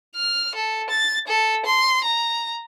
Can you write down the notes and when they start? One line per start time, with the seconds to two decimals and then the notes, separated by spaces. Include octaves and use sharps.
0.16 F6
0.55 A4
0.90 A6
1.28 A4
1.66 C6
2.04 A#5